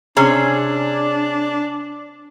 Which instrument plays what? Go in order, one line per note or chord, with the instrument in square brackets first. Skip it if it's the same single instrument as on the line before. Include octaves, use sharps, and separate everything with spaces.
[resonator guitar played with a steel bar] C3 C#4 G#4 [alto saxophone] D4